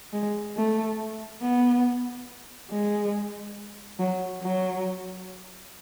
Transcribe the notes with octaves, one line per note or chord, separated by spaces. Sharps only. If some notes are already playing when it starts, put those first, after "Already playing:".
G#3
A3
B3
G#3
F#3
F#3